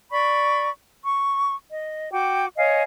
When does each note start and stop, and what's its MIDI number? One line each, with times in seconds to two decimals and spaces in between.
0.11 0.69 74
0.11 0.69 83
0.11 0.69 85
1.04 1.54 85
1.70 2.12 75
2.13 2.48 66
2.13 2.48 79
2.13 2.48 86
2.57 2.83 73
2.57 2.83 75
2.57 2.83 77
2.57 2.83 80